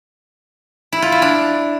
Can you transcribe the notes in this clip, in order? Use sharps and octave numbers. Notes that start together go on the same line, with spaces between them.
E4
F4
E4
D4